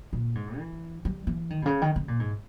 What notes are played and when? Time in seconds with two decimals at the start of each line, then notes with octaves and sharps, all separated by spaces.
0.13 A#2
0.35 G#2
0.58 E3
1.05 G3
1.27 E3
1.50 D#3
1.62 B2
1.66 C#3
1.82 D#3
1.96 C#3
2.08 A#2
2.20 G#2